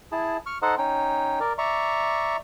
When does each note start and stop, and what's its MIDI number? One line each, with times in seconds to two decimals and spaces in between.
0.12 0.37 64
0.12 0.37 68
0.12 0.37 81
0.46 0.58 85
0.46 0.58 89
0.62 0.75 63
0.62 0.75 69
0.62 0.75 72
0.62 0.75 75
0.62 0.75 78
0.78 1.40 61
0.78 1.40 63
0.78 1.40 79
1.40 1.53 70
1.40 1.53 74
1.58 2.37 74
1.58 2.37 76
1.58 2.37 82
1.58 2.37 85